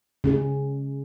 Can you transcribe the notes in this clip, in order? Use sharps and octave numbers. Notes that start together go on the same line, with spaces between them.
C#3 C#4 G#4